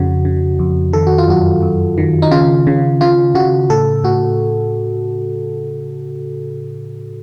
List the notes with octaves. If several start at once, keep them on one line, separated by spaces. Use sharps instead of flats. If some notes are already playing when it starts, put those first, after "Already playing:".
Already playing: F2 C#3 F#4
C#3
F2
D#3 A4
F#4
F4
F#2 F#4
F#2
D#3
D#4
C#3 F4
C#3
C#3 F4
C#3 F#4
A2 A4
A2 F#4